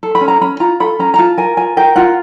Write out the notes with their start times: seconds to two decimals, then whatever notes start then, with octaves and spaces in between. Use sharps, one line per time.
0.03 A4
0.15 B5
0.21 C#4
0.28 A#5
0.41 C#4 B5
0.60 F4 A#5
0.80 A4 B5
0.99 C#4 A#5
1.14 A#5
1.19 F4 A5
1.37 A#4 G#5
1.57 F4 G#5
1.77 A#4 G5
1.96 F4 F#5